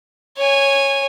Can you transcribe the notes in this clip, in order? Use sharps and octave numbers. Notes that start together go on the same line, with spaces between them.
C#5 G#5